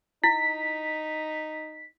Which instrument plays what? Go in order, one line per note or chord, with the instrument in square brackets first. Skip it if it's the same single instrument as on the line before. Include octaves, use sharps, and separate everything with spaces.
[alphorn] D#4 [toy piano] E4 [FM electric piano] B6